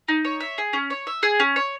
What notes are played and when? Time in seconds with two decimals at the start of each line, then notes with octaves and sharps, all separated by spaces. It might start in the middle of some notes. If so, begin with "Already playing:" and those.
0.08 D#4
0.25 C#5
0.40 E5
0.58 G#4
0.73 C#4
0.90 C#5
1.07 E5
1.23 G#4
1.40 C#4
1.56 C#5